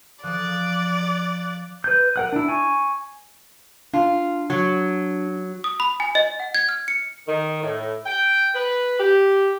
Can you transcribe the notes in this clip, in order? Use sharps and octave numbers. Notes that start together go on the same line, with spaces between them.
F3 D5 F#6
F#6
B4 G6
A#4 F#5 F#6
D4 E4
G#5 C#6
D4 F4
F#3
D#6
B5
G#5
D#5
F#5
G#6
F6
C#7
D#3
A2
G5
B4
G4